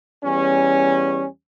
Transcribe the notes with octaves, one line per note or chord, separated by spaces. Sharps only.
E2 G3 C#4